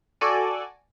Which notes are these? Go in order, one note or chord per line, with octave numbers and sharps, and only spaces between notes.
F#4 A4 D5 G#5